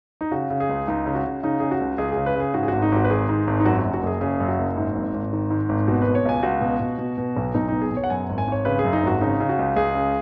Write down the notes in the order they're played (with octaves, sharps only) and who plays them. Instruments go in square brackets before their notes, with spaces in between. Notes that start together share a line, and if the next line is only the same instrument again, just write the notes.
[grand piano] D#4
C#3 F#4
C#3
G#4
C#2
C#2 D#4
C#3
F#4
C#3
C#3 D#4
C#3 G#4
F#4
C#2
C#2 G#4
C#3 G#4
B4
C#3 G#4
G#2 F#4
G#4
G#1 F#4
D#4
G#1 F#4
B4
D#3 G#4
G#2
G#1
D#4
F#2 F#4
F#4
F#1
F#4
F#1 G#4
C#3 G#4
F#2
F#4
F#1
G#2
G#1
G#1
D#3
G#2
G#1
B2 F#4
B2 B4
C#5
C#2 G#5
C#2 F#4
B2
B2
B2
B2
B1
B1 D#4
B2 D#4
G#4
B2
C#5
F#5
F#2 G#5
G#1
G#5
G#1 C#5
C#3 B4
G#4
F#2
D#4
G#1 F#4
C#3 D#4
C#3
F#4
C#2
C#2 G#4
C#3